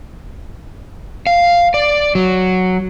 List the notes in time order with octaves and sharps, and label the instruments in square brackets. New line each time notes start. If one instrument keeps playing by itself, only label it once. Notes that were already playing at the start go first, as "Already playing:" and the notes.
[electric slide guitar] F5
D5
F#3